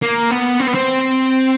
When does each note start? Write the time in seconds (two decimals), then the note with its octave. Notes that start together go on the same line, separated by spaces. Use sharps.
0.03 A#3
0.31 B3
0.60 C4
0.68 B3
0.75 C4